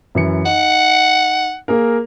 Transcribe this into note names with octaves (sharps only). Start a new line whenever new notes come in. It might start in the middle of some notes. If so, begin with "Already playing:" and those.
F#2 E3 C#7
D#4 F#5
A#3 G#4 A#4